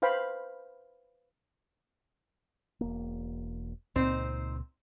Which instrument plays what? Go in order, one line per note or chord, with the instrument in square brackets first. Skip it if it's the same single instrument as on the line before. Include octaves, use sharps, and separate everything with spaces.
[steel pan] B4 C5 F5 G5 B5
[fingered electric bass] E1 A#3
[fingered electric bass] C#2 A#2 [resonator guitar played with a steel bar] C4 D#4 C5